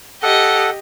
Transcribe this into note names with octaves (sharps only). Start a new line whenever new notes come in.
G4 A4 D#5 F#5